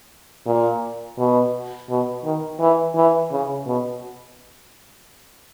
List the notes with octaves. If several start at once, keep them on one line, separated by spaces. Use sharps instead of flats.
A#2
B2
B2
D#3
E3
E3
C#3
B2